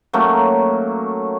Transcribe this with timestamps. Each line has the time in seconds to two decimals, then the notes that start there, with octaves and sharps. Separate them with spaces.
0.13 F#3 A3 A#3 C#4